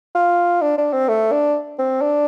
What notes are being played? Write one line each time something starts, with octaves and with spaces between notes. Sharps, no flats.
F4
D4
D4
C4
A3
D4
C4
D4